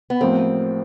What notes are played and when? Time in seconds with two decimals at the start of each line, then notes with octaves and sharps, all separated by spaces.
0.10 B3
0.21 A1 A2 F3 A#3 C4